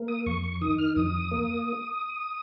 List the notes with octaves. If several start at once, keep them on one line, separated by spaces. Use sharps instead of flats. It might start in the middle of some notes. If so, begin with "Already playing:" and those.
Already playing: A#3
D#6
F2 C#6
C#6
D#3 D#6
F6
F2 D#6
A#3